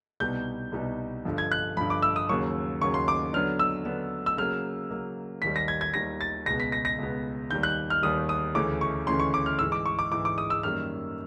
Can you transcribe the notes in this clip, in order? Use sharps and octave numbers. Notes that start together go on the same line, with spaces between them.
C2 B2 G3 B3 D#4 G6
C2 B2 G3 B3 D#4
G2 D3 F3
G#6
F#6
G2 D3 F3 B5
D6
E6
D#6
D#2 C#3 F#3 A#3 C#6
D#2 C#3 F#3 A#3 C#6
C6
D6
D3 F#3 B3 D4 F6
E6
D3 F#3 B3 D4
E6
C#3 F#3 A#3 F6
C#3 F#3 A#3
D#2 D#3 G3 B6
A#6
G#6
G#6
D#2 D#3 G3 A#6
A6
C#2 B2 G#3 B3 A#6
B6
A#6
A#6
C#2 B2 G#3 B3
D#2 D#3 G3 G6
F#6
F6
D#2 D#3 G3 D#6
D#6
D2 C#3 E3 A3 C#4 D6
C#6
D2 C#3 E3 A3 C#4 C6
C#6
D6
F6
G#2 E3 G#3 E6
D6
C#6
D6
G#2 E3 G#3 D6
D6
D#6
E6
F#2 D#3 G3 A#3 F6